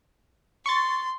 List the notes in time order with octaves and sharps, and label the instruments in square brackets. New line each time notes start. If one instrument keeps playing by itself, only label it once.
[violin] C6 [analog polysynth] C#6 A6